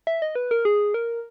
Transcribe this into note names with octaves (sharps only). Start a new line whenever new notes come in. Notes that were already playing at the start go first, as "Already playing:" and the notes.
E5
D#5
B4
A#4
G#4
A#4